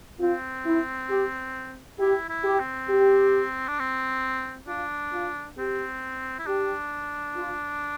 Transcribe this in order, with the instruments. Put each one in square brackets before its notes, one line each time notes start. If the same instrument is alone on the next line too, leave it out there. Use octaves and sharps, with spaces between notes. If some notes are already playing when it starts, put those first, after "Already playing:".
[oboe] C4 [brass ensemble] F4
[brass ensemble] E4
G4
[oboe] E4 [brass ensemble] G4
[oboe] E4
[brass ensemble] G4
[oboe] C4
[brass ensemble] G4
[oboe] D4
C4
[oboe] D4 [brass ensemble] F4
[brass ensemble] F4
[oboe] C4 [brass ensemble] G4
[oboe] E4
[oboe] D4 [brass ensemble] G4
[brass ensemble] F4